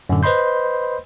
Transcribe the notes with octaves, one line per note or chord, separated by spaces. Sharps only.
F#2 A2 D3
B4 C5 D#5 B5 C6 G6